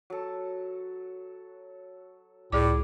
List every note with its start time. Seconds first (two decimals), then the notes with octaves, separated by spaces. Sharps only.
0.10 F#3 A4
2.52 C#2 A2 G#4 D5 D6